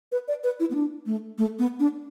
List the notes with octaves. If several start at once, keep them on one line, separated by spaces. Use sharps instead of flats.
B4
D5
B4
E4
B3
D4
A3
A3
B3
D4